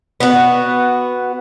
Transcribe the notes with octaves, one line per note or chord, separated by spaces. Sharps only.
B3 F#4